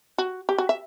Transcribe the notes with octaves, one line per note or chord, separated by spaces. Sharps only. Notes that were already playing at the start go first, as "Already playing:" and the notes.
F#4
G4
F#4
E5